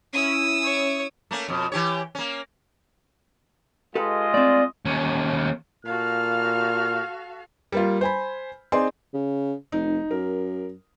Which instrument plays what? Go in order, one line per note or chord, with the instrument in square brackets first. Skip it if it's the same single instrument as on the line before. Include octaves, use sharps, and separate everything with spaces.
[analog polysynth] C#4 E4 [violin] D#6 E6
[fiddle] C#5
[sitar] A3 A#3 C#4
F2 B2
E3 G4 C#5
A#3 C#4
[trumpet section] G#3 F4 D#5 [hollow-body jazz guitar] G4 A4 B4
[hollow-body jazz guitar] A3 C4 [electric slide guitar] D5
[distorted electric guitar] D#2 C#4
[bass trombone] A#2 [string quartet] F#4 A4 F5 [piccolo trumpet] F6
[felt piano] G3 A#3 F4
C5 G#5 B5
C4 D#4 G#4 D5 C6
[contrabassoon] C#3
[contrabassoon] F1 [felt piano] D#4
[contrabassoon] F#2 [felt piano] A#4